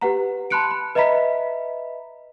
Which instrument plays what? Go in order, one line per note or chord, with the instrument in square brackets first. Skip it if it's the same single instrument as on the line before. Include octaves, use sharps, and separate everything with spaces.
[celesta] G4 B4 F#5 A#5
A5 B5 C6 F#6 C#7 D7
B5
B4 D#5 E5 A#5 B5 B6